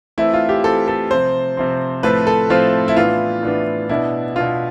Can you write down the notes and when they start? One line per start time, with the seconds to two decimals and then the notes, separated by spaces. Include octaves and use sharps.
0.18 E3 A3 C4 E4
0.33 F4
0.49 G4
0.64 E3 A3 C4 A4
0.88 A4
1.11 C3 F3 C4 C5
1.57 C3 F3 C4
2.03 A2 F3 A3 C4 B4
2.27 A4
2.50 A2 F3 A3 C4 F4
2.88 E4
2.96 A2 E3 B3 D4 F4
3.43 A2 E3 B3 D4
3.89 B2 B3 D4 E4
4.36 B2 B3 D4 F4